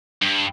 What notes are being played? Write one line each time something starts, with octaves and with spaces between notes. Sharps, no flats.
G2